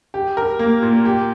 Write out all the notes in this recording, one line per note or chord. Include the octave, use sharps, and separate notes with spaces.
G4
A#4
A#3
A#2
G4